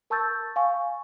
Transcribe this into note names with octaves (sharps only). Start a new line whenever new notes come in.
A#4 A5 C#6 E6 G6 A6
F5 G#5 C#6